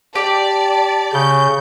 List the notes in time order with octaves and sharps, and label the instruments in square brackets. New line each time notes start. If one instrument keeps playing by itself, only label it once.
[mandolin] G4 [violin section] D5 [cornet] A5
[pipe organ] C#3 [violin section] G6